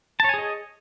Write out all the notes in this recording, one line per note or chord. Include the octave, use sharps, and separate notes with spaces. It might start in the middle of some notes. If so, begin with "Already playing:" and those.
G#4 C#5 D#5 G#5 A5